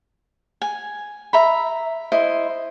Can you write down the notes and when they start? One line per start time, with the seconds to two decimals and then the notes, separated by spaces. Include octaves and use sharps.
0.62 G#5
1.33 E5 A#5 B5
2.12 E4 C5 D#5